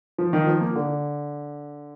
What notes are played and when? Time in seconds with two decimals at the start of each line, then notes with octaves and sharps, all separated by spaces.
0.18 F3
0.33 D#3
0.47 F3
0.61 A#3
0.75 D3